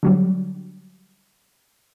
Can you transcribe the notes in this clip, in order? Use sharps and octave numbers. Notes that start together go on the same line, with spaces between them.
D3 F#3 G3